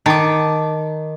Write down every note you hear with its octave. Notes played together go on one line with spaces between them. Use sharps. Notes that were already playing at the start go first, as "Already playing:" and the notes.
D#3 A5 D6